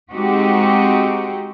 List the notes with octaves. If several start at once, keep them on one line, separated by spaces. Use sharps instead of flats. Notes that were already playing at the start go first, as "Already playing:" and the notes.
G#3 C4 D#4 F#4 G4